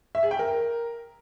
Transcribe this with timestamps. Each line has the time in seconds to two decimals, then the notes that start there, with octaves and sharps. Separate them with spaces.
0.15 E5
0.23 G#4
0.31 G5
0.39 A#4